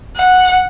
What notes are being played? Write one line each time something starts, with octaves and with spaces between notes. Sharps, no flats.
F#5